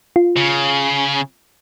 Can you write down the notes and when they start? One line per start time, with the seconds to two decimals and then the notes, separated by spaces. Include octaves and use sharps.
0.16 F4
0.37 C#3